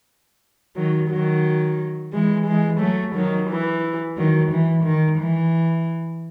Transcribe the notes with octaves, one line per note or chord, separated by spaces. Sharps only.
D#3 F#3
D#3 F#3
E3 G#3
E3 G#3
F#3 A3
D#3 F#3
E3
D#3 F#3
E3
D#3
E3